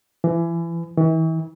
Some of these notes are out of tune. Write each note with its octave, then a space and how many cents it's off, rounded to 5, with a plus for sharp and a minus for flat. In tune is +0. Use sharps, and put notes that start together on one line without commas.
E3 +30
E3 -35